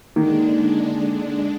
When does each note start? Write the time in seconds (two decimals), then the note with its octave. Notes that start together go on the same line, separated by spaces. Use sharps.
0.16 D3 D#3 G#3 A#3 D4